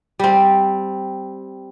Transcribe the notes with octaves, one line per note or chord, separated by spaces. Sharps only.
G3 C4